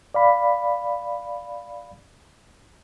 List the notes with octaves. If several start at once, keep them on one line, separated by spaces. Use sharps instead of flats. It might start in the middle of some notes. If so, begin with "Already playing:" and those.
D5 F5 B5